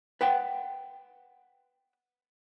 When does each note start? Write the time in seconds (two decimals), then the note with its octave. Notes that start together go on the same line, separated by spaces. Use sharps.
0.21 B4 F#5 G5